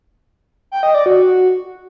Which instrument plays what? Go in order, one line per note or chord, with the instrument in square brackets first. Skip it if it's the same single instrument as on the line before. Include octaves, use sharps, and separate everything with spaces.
[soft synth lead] G5
D#5
D5
F#4